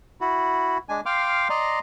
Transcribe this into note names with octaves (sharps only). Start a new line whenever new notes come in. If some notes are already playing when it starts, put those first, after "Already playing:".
E4 F#4
G#3 D4 G#5
F5 G5 C6 D6 F6
D5 D#5 A#5 C6